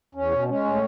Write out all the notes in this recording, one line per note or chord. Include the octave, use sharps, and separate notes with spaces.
E2 C#4
B2
G#3 C#4
A2